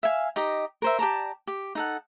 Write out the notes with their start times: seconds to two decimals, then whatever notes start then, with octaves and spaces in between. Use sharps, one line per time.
0.03 E5 F5 G#5
0.36 D#4 G4 D#5
0.82 A#4 C5 E5
0.99 G4 D5 A5 A#5
1.47 G4
1.75 D#4 A4 F#5